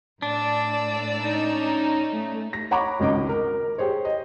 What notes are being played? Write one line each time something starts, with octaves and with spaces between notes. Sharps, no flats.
A2 D4 D5 E6
C#4 D#4
A3
A#6
C#5 F#5 A#5 B5 C#6 D6
G#1 C#2 C#4 D#5 D6
A#4
G4 G#4 C5 C#5
D#5